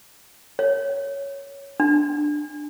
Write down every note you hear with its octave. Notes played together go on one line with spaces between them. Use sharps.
C#5
D4